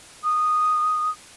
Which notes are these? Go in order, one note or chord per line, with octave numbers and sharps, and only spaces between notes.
D#6